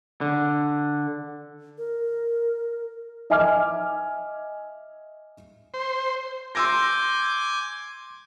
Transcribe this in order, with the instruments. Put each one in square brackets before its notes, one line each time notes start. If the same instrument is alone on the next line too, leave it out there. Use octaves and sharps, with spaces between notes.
[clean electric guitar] D3
[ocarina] A#4
[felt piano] D#5 E5 G#5 D6 F6
[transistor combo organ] C5
[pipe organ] G#5 D6 G6 [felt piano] C6 E6 A#6